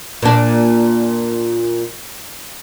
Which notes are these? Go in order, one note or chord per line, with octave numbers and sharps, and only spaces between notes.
A#2 D4